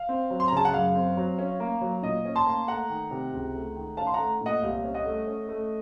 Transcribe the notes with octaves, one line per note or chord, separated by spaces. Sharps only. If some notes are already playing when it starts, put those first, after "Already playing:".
Already playing: F5
C4
F#3
C6
A#5
C#3 A5
F#5
F#2 F5
C4
F#3
C#4
A#3
F#3
A#2 D#5
C#4
A5 C6
A#3
A3 F#5 A#5
D#3
C3
C#2
A3
D#3
C#4 F5 A5
C6
A3 F#5 A#5
A#2 D#5 F#5
C2 F5
C#4
D#5 F#5
A3
C#4
A3